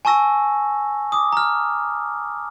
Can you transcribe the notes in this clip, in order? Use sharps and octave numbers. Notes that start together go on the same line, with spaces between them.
G#5 A5 C#6 E6 A#6
D6 D#6
A#5 F6